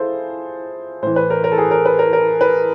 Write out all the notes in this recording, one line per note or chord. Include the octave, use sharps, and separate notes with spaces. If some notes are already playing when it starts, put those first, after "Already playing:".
Already playing: E4 F4 G#4 A4 C5
A2 E3 C5
B4
A#4
A#4
A4
G#4
A#4
B4
A#4
A#4
B4